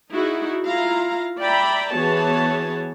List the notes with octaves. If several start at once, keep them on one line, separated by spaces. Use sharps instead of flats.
D#4 E4 F#4 G#4
E4 F4 F5 A#5
D5 E5 G5 A#5 B5
E3 B3 F#4 G#4 C#5 A5